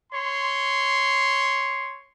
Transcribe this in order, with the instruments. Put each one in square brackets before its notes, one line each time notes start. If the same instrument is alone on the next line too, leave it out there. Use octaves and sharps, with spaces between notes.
[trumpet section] C#5 C6